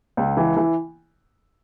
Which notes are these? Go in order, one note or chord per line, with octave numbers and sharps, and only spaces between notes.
C#2
E3
E3